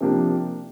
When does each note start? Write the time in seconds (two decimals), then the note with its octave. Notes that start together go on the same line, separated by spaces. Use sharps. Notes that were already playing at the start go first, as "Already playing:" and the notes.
0.01 C3 F3 A#3 D4 G4